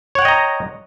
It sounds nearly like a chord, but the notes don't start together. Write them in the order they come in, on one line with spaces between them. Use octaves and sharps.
C#5 F#5 G5 D#5 A#5